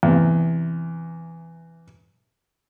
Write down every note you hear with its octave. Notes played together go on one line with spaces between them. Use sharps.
E2 C3